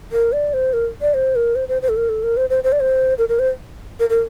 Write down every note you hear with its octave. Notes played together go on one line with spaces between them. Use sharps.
A#4
D5
C5
A#4
D5
C5
A#4
C5
C5
C5
A4
A#4
A4
A#4
C5
C5
C5
D5
C5
A#4
A#4
C5
A#4
A#4